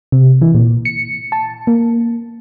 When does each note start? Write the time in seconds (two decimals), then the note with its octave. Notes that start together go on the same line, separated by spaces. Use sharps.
0.12 C3
0.42 E3
0.55 A#2
0.85 C#7
1.32 A5
1.67 A#3